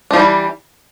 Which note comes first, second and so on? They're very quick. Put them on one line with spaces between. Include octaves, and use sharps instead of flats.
D4 F3 G3 E3